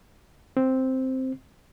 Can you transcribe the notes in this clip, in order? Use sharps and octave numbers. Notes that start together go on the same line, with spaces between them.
C4